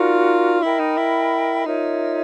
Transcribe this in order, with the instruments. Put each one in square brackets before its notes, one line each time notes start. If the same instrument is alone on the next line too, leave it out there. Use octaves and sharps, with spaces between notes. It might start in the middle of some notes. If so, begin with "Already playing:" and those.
Already playing: [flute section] D#4 F#4 A#4 D5 [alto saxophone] F4
[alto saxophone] E4 [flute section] A#4 D#5 G5 B5
[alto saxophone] D#4
E4
[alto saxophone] D#4 [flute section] F4 A#4 C#5 E5